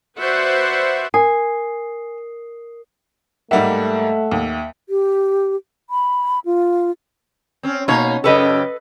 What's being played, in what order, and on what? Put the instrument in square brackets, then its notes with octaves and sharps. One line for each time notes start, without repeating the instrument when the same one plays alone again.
[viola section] F#4 B4 C5 D5 E5 F#5
[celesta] A#4 D#6 C7 [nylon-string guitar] G#5
[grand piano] G#2 G3 A#3 [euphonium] A3 [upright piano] E5 F#5
[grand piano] D#2
[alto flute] G4
B5
F4
[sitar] C4 C#4
[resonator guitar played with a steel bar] B2 A#3 [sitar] D#4 C#5
[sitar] F#2 C#3 G4 [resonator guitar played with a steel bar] A4 B4 D#5